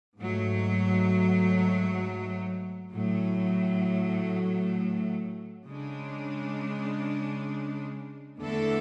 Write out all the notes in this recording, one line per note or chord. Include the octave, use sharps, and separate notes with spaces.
G#2 F#3 A3
A2 F#3 A3
C#3 G#3 D4
E2 D3 A3 E4 A4